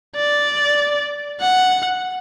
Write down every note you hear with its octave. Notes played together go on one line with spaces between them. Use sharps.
D5
F#5